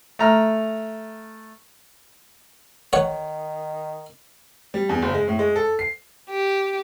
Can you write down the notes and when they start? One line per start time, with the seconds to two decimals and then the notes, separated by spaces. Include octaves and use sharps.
0.19 A3 A#5 F6
2.93 D#3 C#5 F#5
4.74 G3
4.89 E2
5.02 F#1
5.14 G#3
5.28 A2
5.39 G#3
5.56 A4
5.79 C7
6.30 G4